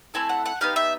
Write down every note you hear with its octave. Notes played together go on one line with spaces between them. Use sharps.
A3 C4 E4 A4 G#5
F#5
F#5
B3 D#4 G4 F5
E5